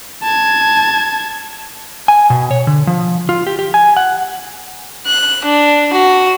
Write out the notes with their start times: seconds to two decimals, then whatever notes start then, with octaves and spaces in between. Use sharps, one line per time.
0.23 A5 G#6
2.08 G#5
2.30 B2
2.51 C#5
2.67 D3
2.87 F3
3.29 F4
3.47 G4
3.59 G4
3.74 G#5
3.97 F#5
5.07 F#6
5.45 D4
5.93 F#4